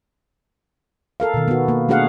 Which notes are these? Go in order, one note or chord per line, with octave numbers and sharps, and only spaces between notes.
A4 A#4 F5
B2 D#3
B3 F#4
A#3
A3 D4 F#4 G#4 F5 F#5